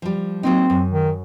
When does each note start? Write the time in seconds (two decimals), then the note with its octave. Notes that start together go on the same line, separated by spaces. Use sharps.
0.02 F3 G3
0.43 F#3 A#3 C4 D#4
0.70 F#2
0.91 D#3